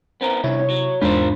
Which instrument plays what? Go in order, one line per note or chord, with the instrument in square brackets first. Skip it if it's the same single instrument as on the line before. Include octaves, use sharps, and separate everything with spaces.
[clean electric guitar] B3 C4 A#4
[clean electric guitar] G2 D#3 [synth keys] C3 [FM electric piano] E4 [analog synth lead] C#5
[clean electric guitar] F#3
[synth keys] E2 D4 [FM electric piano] G#2 B5 [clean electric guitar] F4 A#4 C5